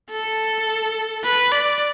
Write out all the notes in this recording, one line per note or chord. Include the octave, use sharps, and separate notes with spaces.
A4
B4
D5